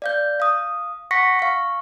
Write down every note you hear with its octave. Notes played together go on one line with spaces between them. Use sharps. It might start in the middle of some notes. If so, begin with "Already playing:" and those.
D5 F5 G6
F5 D#6
F#5 C#6 A#6 B6 C#7
F5 C#6